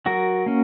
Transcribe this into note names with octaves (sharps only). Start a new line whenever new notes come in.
F#3 F#4 A#4
A#3 C#4